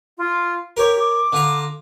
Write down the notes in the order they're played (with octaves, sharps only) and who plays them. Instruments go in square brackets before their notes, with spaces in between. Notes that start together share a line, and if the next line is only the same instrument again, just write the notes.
[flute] F4
[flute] G4 [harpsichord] A#4 C#5
[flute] D6
[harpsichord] D3 F4 A#5